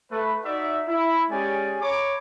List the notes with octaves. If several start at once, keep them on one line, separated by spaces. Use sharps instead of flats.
A3 B4
D#4 F#4 D5 E5
E4
G#3 C#4 G4 G#4 D5 G#5
C#5 A#5 B5 D6